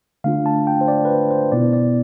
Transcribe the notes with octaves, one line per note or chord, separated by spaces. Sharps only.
D3 A3 D4 F4 F5
A5
G5
C5
D5
B4
C5
C5
B2 B3 E4 D5
D5